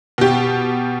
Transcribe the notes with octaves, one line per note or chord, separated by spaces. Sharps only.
B2 G4